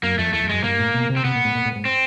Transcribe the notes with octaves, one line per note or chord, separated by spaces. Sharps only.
F#2 A#3
F2 A3
E2 A3
F2
F#2 G#3
G2 A#3
A2
B2
C3
C4
C3 B3
A#2
A2
A#2
A2
G#2
C4